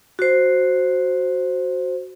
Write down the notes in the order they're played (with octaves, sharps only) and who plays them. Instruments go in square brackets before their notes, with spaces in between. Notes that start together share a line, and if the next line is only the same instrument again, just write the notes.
[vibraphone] F#4 C5